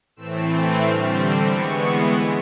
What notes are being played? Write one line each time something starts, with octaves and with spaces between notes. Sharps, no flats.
A2 E3 A3 C4 E6
D3 G3 C4 F6
E3 G#3 B3 C#6